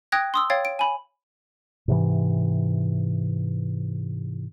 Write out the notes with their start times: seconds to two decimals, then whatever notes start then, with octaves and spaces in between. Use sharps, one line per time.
0.12 G5 D#6 F#6 G#6 A#6
0.34 C6 D#6 E6
0.50 C#5 F5 G5 G#6 A6
0.65 D7
0.79 G#5 B5
1.88 G#2 C3 E3